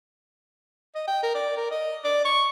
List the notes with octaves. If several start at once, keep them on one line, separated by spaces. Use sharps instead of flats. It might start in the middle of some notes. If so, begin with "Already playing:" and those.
D#5
G5
A#4
D5
A#4
D#5
D5
C#6